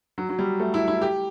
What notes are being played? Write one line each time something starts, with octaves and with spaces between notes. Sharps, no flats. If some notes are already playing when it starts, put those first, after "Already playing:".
F#3
F#3
G3
A3
E4
E4
G4